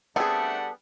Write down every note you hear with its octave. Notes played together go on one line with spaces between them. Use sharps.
G3 A3 B3 C4 D4 G#4 A4 F#5